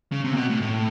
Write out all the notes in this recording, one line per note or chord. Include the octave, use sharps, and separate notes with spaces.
C#3
C3
A#2
B2
A2
A2